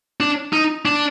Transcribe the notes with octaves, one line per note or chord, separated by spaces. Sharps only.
D4
D#4
D4